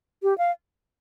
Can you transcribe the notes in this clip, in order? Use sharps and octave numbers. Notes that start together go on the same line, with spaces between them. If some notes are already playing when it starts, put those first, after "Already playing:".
G4
F5